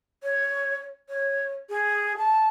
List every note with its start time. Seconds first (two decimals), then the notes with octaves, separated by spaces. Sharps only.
0.23 C#5
1.09 C#5
1.70 G#4
2.17 A5